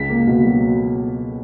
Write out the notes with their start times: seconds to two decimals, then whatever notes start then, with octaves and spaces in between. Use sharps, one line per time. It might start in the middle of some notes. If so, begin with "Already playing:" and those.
Already playing: C#2 B6
0.09 A#3
0.27 B2
0.46 F#3